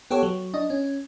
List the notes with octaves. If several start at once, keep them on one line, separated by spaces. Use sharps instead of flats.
B3 G4 A4 C#5
F#3
D4 D#5
C#4